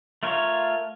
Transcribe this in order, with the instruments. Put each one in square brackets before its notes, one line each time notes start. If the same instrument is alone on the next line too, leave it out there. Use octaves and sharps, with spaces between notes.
[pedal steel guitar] A3 F4 A#4 C#5